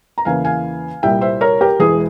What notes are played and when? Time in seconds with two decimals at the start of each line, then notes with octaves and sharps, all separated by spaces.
0.18 A#5
0.25 E2 C#3 E3 A#3 F5 G#5
0.45 F5 G#5
1.03 C2 A#2 G3 E5 G5
1.21 C5 E5
1.41 A#4 C#5
1.61 G4 A#4
1.79 E1 E2 E3 G#3 G#4